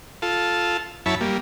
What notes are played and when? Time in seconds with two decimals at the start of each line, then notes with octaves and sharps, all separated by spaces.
0.22 F4 A4
1.06 F#2 E4 C#5 A5 B5
1.21 G3 A#3